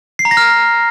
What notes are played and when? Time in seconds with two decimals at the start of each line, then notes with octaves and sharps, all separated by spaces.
0.19 C7
0.25 A#5
0.31 A#6
0.37 F6